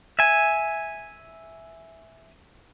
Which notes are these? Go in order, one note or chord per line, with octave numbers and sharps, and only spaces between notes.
E5 G#5